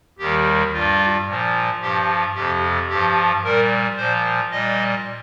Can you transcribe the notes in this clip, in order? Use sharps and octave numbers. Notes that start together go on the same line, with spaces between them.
D#2 D#3 G3 G4
G2 G3 F4
A#2 F3
G2 F3 G4
F2 C3 F3 G4
G2 F3 G4
A#2 G3 A#4
A#2 F3 C5
A#2 G3 D#5